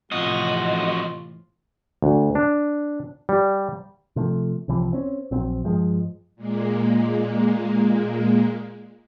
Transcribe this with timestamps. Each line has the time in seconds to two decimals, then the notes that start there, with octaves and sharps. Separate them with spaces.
0.12 F2 A2 C3 E3 F4 F#4 D#5
2.02 D2
2.35 D4
3.29 G3
4.16 C3 F3 A3
4.68 C2 C3 E3 F3
4.93 C4 C#4
5.31 A#1 F#3 C4
5.64 G2 F3 G#3
6.36 A#2 G#3 A#3